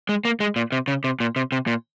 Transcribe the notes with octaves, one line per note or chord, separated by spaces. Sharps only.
G#3
A#3
G#3
A#2
C3
C#3
C3
A#2
C3
C3
A#2